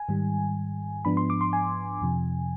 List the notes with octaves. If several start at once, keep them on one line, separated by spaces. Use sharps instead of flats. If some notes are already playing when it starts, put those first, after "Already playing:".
Already playing: G#5
G#2 D#3 G3
G#2 F3 B3 D4 B5
C6
D6
C6
G#5
F2 C3 F3